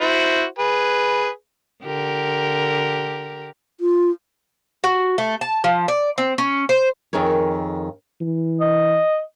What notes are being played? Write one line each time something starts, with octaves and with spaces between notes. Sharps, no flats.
E4 F#4 C5
G#4 B4
D3 G4 A#4
F4
F#4
A3
A5
F3
D5
C4
C#4
C5
F2 D#3 G#4 A#4 C#5
E3
D#5